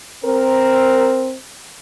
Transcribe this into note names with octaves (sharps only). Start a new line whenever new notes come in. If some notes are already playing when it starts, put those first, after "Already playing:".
C4 A#4